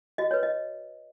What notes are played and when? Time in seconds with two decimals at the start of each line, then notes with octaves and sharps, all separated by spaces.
0.18 F#4 D#5
0.31 B4 C#5
0.43 D#5